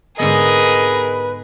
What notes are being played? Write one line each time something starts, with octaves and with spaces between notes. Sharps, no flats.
G#2 D3 B3 G#4 A#4 B4 D#5